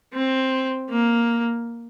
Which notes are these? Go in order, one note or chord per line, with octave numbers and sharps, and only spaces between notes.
C4
A#3